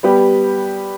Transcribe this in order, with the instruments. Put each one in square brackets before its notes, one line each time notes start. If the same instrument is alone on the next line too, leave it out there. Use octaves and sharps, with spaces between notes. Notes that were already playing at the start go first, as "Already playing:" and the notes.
[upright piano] G3 B3 G4